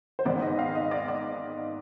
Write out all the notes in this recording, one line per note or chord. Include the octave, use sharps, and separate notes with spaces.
C5
G#1 G#2 D#3 B3 D5
D#5
F5
D#5
D5
D5